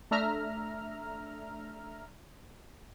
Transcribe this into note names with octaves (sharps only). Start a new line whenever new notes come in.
A3 D4 E5 A#5 F6